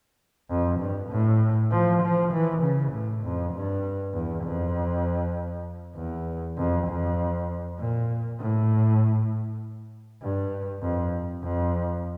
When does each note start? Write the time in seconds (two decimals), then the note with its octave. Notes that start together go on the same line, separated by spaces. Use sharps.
0.50 F2
0.80 G2
1.10 A2
1.71 F3
2.02 F3
2.32 E3
2.62 C#3
2.92 A2
3.24 F2
3.54 G2
4.14 E2
4.44 F2
5.96 E2
6.58 F2
6.88 F2
7.79 A#2
8.39 A2
10.22 G2
10.82 F2
11.43 F2